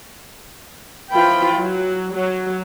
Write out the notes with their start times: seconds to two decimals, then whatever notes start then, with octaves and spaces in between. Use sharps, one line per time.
1.11 E3 F3 F4 G5 B5
1.57 F#3
2.12 F#3